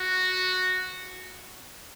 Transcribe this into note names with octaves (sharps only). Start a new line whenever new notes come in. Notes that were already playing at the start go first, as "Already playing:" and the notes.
Already playing: F#4